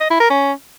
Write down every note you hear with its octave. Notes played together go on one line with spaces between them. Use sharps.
D#5
E4
A#4
C#4